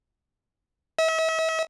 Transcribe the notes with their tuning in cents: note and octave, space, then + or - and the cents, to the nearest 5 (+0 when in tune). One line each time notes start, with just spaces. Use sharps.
E5 -40